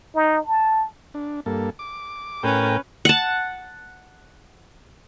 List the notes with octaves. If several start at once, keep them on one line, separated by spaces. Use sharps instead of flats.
D#4
A5
D4
G2 A#3 A4
D6
A2 C#4 A#4 B4 G5
F#5 A5